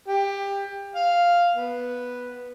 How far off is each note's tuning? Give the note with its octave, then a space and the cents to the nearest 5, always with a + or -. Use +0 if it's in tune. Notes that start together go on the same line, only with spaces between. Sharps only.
G4 +20
F5 +0
B3 -5